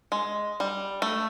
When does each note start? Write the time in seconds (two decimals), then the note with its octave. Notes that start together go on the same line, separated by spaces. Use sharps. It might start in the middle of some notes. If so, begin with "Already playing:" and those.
0.12 G#3
0.60 G3
1.02 A3